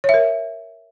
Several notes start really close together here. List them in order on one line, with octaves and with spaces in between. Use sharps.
C#5 E5 A#4